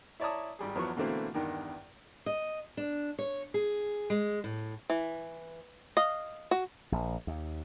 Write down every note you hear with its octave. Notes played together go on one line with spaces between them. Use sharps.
E4 C#5 D5 A5 A#5 D#6
G#1 G3 G#4
E2 F3 F#3 B3 C#6
B2 D3 E3 A3 A#3 C4
E2 G2 D#3
D#5
D4
C#5
G#4
G#3
A2
E3
D#5 F5
F#4
A#1
D#2